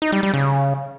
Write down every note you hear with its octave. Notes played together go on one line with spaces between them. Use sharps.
D#4
G3
G3
C#3